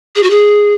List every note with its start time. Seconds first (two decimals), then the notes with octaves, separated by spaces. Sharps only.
0.15 G#4
0.23 F#4
0.30 G#4